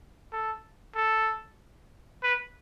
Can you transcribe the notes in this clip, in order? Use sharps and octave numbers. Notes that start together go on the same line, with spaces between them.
A4
A4
B4